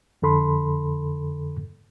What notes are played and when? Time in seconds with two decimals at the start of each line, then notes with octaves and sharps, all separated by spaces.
0.22 F2 D3 A4 B5 C6